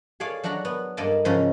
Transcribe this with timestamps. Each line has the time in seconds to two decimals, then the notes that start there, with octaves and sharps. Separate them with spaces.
0.20 G#4 A4 C#5 D5 F5
0.43 F#3 D4 F#4 F#5 A#5
0.65 B3
0.97 G2 A#3 A4 D5 D#5 A5
1.25 G#2 C#3 F3 C#4 C#5 A#5